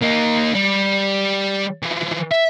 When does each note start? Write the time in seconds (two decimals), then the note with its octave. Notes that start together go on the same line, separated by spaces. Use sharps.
0.02 A#3 D#4
0.55 G3
1.82 E3 F3
2.31 E5